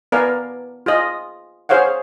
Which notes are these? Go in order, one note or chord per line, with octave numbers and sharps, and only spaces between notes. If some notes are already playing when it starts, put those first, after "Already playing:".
B3 A#4 B4 D5 F5 G#5
F4 G#4 D#5
G#4 C5 C#5 F5 F#5